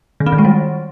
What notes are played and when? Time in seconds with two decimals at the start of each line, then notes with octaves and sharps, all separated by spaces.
0.20 D#3
0.26 C4
0.32 D#3
0.39 G#3
0.45 G3